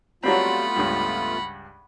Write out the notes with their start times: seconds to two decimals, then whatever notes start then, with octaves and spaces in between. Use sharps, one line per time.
0.24 F#3 G3 A3 B3 C4 F4 F#5 B5
0.76 C#2 G2